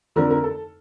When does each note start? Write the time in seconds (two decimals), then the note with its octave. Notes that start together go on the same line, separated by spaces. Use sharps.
0.16 F2 D3 F3 A#4
0.30 A#4
0.44 A4